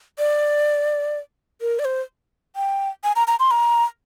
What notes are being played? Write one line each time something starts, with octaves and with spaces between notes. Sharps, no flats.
D5
A#4
D5
C5
G5
G#5
A#5
A#5
C6
A#5